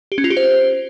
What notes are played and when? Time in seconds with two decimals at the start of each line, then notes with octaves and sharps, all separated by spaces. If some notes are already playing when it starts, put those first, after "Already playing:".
0.12 G4
0.18 C#4
0.24 F4
0.30 G4
0.37 C5